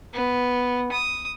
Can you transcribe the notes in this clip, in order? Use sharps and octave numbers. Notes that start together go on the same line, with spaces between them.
B3
D#6